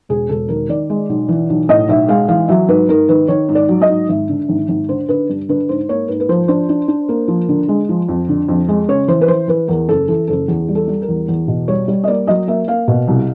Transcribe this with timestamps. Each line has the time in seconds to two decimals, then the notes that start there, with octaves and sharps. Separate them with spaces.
0.09 E1 G#4
0.29 E1 A4
0.49 D#3 A#4
0.69 D#3 D5
0.90 G#3
1.09 B1
1.29 E3
1.50 B1
1.69 A2 D#5
1.88 B1 E5
2.09 G#3 F5
2.28 E3 F5
2.48 F#3 E5
2.68 G#2 B4
2.89 G#2 A#4
3.09 D#3 B4
3.28 D#3 C#5
3.49 G#2
3.55 D5
3.69 F#3
3.82 D#5
3.89 G#2
4.09 G#1 E5
4.29 D3
4.49 G#1
4.68 G#1
4.89 D3 C5
5.08 D3 B4
5.29 G2
5.49 D3 B4
5.69 G#2 C5
5.89 A#3 C#5
6.08 G#2 B4
6.20 B4
6.29 F3 C5
6.48 D4 C5
6.69 D4
6.88 D4
7.09 A#3
7.28 F3
7.49 D3
7.68 G#3
7.89 F3
8.09 F2
8.29 D3
8.49 F2
8.68 G#3
8.88 C#3 C#5
9.08 E3 C5
9.21 B4
9.28 E3 C5
9.48 E3 B4
9.68 E2 A#4
9.89 F#1 A4
10.08 E3 A4
10.28 F#1 A4
10.48 E2 G#4
10.68 G3
10.75 A4
10.88 G3
11.02 A#4
11.08 E2
11.29 E2
11.48 B2
11.68 G3 C#5
11.88 G3
12.04 D#5
12.08 A#3 D5
12.27 F#3 D#5
12.48 A#3 E5
12.68 A#3 F5
12.88 B2
13.08 C2